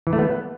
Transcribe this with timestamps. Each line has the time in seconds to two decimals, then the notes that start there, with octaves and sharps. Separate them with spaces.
0.07 E3
0.13 A3
0.19 B3